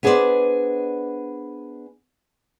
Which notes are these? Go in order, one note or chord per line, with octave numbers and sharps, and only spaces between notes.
B3 D4 G#4 B4 C5 D5